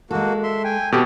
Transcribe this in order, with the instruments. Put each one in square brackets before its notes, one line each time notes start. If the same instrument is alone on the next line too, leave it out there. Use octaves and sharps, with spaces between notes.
[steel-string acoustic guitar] G#3 A4 [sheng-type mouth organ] A#3 F#4
[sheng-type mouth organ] E5 C6
G5 G#5
[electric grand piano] B2 G4 [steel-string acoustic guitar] C4 A4 B4 [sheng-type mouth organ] A5